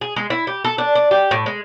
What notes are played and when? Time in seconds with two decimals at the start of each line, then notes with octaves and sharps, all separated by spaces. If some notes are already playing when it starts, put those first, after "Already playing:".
0.01 G#4
0.16 G#3
0.30 E4
0.47 G4
0.64 A4
0.78 D4
0.95 D4
1.11 G4
1.31 A2
1.46 G#3